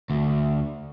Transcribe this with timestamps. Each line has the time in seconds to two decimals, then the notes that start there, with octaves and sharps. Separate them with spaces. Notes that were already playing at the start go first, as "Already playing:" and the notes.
0.10 D2